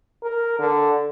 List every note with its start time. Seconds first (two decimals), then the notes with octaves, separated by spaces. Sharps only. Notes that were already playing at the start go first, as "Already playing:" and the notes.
0.23 A#4
0.59 D3